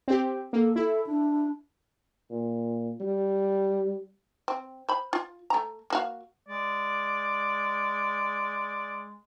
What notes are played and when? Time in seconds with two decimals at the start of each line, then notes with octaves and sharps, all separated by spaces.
0.08 C4 G4
0.53 A#3 A4
0.76 E4 A4
1.07 D4
2.30 A#2
3.00 G3
4.48 C4
4.89 C5 B5
5.13 F4
5.50 A3 A#5
5.90 A#3 F#4 F5
6.48 G#3 D5